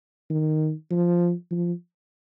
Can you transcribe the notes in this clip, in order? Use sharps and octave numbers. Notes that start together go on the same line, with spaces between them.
D#3
F3
F3